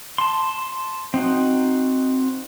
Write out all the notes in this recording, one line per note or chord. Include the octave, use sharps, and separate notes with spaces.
A5 C6
C4 D#4 F#4